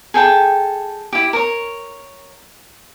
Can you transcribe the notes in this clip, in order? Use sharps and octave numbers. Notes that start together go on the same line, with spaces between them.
G#4 A4 G5 A5
E4 G4
A#4 C#5